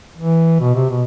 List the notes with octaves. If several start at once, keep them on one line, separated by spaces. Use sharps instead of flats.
E3
B2
C3
B2